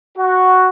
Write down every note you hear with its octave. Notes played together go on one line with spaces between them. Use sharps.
F#4